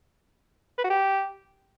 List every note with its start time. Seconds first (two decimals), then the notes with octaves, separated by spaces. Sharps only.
0.78 B4
0.84 F#4
0.90 G4